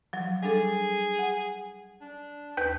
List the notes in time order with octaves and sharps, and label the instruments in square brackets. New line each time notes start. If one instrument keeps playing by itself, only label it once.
[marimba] F3 F#3
[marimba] G3 D4 A4 [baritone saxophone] G#4
[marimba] F#5
[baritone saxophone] D4
[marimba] D#2 B4 G6